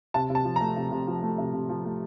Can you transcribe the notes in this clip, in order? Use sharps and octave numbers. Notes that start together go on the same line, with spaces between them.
C3 A5
C3
A5
F3
A3 A#5
C3
C3
F3
A3
C3
C3
F3
A3